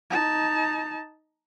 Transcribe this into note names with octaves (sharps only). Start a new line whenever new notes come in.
D#4 A5